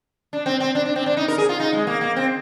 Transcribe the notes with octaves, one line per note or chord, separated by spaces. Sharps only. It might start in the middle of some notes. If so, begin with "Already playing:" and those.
D4
C4
C4
D4
D4
C4
D4
D#4
A#4
G#4
F4
D#4
G#3
A#3
A#3
C4